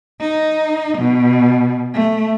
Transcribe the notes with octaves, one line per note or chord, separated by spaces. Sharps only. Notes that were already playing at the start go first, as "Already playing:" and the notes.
D#4
B2
A3